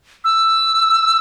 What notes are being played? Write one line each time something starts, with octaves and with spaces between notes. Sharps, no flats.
E6